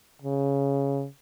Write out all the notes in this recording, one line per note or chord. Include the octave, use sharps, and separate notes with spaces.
C#3